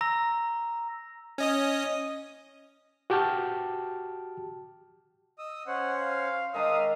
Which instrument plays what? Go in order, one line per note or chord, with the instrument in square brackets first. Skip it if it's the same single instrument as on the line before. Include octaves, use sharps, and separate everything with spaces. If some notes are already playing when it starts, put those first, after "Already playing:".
[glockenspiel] A#5 E6 A#6
[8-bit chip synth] C#4 D#5 D#6
[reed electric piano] F#4 G4 G5 A5 F6
[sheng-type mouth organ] D#5 D#6 E6
[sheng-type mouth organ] C#4 C5 C#5 [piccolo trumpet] F#5
[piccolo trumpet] F5
[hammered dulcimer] D#3 G#3 D4 [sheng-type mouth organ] E5 F5 A#5 [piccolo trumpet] D#6